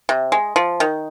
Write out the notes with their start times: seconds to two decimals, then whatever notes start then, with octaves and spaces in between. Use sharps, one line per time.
0.09 C3
0.32 G#3
0.56 F3
0.80 D#3